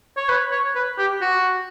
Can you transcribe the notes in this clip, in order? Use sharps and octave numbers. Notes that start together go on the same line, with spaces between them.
C#5
B4
C#5
B4
G4
F#4